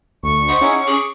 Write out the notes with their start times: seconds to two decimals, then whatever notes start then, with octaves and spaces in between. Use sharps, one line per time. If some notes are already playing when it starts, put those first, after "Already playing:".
0.23 D2 C#6
0.49 C5 D#5 F#5 B5
0.61 C#4 D#4 E4 G#4 F#5
0.87 G#4 D6